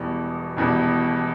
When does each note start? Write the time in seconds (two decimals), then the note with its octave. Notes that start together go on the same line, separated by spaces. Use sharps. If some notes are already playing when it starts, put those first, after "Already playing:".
Already playing: E1 E2 B2 G3
0.57 E1 E2 B2 G3